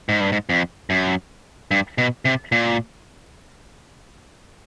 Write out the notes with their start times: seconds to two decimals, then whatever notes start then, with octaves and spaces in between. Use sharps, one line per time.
0.09 G#2
0.20 G2
0.32 G#2
0.49 F2
0.90 F#2
1.71 G2
1.98 B2
2.25 C3
2.52 A#2